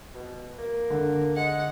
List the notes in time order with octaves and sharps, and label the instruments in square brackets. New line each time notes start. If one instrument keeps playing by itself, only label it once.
[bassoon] B2
A#3
[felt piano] D3
[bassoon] G#3 [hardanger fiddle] F#5